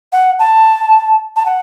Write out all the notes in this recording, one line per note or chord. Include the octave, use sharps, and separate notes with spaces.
F#5
A5
A5
F#5